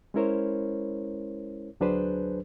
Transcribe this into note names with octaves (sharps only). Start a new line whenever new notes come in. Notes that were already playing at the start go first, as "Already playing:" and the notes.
G#3 C#4 E4 A#4 C5 C#5
D2 F#3 D4 G#4 B4 C5